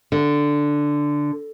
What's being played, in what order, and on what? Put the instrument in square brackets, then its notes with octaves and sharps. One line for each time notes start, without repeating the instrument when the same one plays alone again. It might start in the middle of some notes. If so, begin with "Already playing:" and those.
[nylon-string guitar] D3